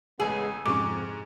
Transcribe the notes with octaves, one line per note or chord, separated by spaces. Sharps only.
A1 C#3 G#3 B3 G#4 E6
F2 G#2 C3 C#4 C#6 D6